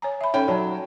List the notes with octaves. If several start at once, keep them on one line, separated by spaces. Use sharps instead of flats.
C#5 G#5 A#5
E5 B5
C#4 D#4 A4 G5 B5
F#3 D5 A5 A#5